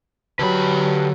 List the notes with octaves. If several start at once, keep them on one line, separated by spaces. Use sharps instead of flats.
D3 F#3 G4 B4 B5